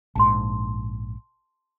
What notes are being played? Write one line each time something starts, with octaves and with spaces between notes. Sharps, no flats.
A#1 G#2 A5 C6